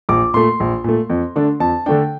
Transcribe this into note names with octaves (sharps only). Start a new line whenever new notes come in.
A#1 D6
A#2 A3 C6
A#1
A#2 A3
F2
D3 A3 D4
F2 A5
D3 A3 D4 G5